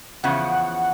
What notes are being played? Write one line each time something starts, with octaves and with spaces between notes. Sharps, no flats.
E2 C#3 F3 F#5